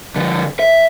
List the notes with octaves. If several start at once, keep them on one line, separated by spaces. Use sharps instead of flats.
D3 F3
E5